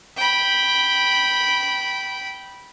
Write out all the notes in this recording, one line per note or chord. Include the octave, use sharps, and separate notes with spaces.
G5 B5